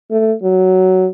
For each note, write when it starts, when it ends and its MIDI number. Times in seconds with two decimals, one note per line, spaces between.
0.11 0.33 57
0.43 1.07 54